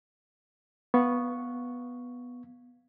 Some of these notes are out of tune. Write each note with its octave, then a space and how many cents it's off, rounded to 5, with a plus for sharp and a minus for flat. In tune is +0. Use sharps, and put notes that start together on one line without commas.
B3 -5 F5 +0 C#6 +0